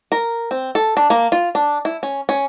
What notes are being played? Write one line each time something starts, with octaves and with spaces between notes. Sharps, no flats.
A#4
C4
A4
D4
A#3
F4
D4
E4
C#4
C#4